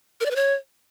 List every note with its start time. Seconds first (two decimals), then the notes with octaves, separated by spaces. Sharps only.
0.21 A#4
0.26 D5
0.31 B4
0.36 C#5